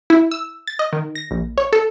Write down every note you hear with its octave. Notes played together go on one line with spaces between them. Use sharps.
E4
E6
A6
D#5
D#3
A#6
A#1
C#5
A4